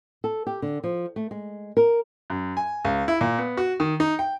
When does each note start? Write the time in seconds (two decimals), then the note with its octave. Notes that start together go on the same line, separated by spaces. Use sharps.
0.24 A4
0.47 G4
0.62 D3
0.84 F3
1.16 A3
1.31 G#3
1.77 A#4
2.30 F#2
2.57 G#5
2.85 C#2
3.08 E4
3.21 A#2
3.39 B3
3.57 F#4
3.80 D#3
4.00 D#4
4.19 G5